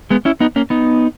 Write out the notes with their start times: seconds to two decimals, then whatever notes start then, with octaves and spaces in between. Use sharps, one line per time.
0.10 G#3 B3
0.25 C#4 E4
0.40 B3 D#4
0.56 A#3 C#4
0.70 B3 D#4